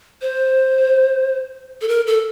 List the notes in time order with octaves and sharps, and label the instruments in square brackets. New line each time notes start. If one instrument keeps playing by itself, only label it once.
[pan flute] C5
A4
A#4
A4